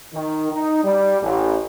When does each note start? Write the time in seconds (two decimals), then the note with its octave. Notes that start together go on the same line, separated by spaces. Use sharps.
0.13 D#3
0.52 D#4
0.84 G3
1.21 A1